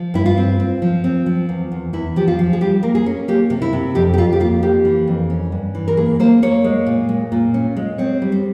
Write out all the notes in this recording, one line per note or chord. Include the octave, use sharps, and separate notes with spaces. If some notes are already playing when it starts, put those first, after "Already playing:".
Already playing: F3
G2 E4
F4
C4
C4
F3
C4
F3
E2
E2
E2 E4
F3 G4
F4
F3
G#4
G3 G4
A#3 A#4
G#4
C#4
A#3 G4
C3
E4
C3
F2 G4
G4
F2 F4
G4
A#3 F4
A#3 G4
E3
F2
C#4
G2
E3
A#4
A#3 G#4
A#3 C5
A#3 C#5
G#3
A#2
G#3
A#2
C#4
G#3
C4 C#5
G3
C5